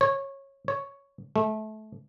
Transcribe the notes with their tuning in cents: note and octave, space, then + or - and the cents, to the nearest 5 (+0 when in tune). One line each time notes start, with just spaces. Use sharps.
C#5 -15
C#5 +5
A3 -25